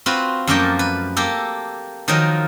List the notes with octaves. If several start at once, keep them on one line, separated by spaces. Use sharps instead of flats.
C4 F4 F#4 B4
F#2 F3 A3 A#3 D5 G5
B4
A#3 G4 A4
D#3 F3 F#3 A#4 D#5